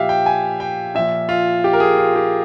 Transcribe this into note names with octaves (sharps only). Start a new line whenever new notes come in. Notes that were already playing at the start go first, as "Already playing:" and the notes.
Already playing: A#2 F3 G4 E5 F5
G5
G#5
G5
A#2 F3 E5
F4
G4
A#4
G#4
F4
G4